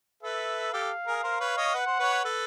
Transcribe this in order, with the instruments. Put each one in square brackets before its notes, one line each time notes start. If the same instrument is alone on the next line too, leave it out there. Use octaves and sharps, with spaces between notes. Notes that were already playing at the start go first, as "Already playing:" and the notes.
[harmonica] A4 B4 [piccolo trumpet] E5
[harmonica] G4 A4 [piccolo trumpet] F5
[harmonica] G#4 A#4
A#4 C5
B4 C#5
C#5 D#5
[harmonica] B4 [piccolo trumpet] F#5
[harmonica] C5
B4 C#5
A4 B4